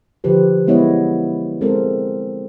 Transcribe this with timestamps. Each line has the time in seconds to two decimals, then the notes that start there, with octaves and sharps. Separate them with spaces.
0.24 D3 F3 G4 B4 C5
0.67 F#3 G#3 B3 E4 C#5 D#5
1.61 G#3 C4 A4 A#4 C5